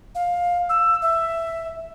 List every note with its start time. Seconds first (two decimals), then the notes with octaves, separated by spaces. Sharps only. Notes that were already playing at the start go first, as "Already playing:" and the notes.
0.15 F5
0.69 E6
1.02 E5